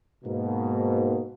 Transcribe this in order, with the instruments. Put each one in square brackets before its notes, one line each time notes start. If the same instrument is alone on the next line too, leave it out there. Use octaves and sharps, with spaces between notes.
[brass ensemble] G#2 B2 A#3